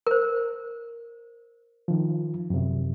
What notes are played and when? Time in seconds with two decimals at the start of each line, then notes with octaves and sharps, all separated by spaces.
0.07 A#4 C5
1.88 D#3 F3
2.50 F#2 C3